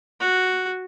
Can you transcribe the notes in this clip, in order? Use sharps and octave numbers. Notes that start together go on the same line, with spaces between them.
F#4